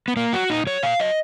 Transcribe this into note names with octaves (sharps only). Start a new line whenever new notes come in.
B3
A#2 A#3
F#3 F#4
A#2 D#4
F#3 C#5
A#2 F5
F#3 D#5